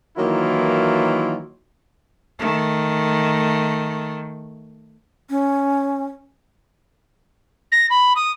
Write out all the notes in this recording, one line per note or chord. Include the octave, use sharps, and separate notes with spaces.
D#3 E3 F#3 A#3 E4 F4
D#3 A3
C#4
A#6
B5
D#6